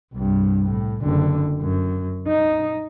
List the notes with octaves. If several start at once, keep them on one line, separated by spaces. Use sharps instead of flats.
C2 G2
A2
F#1 D3
F#2
D#4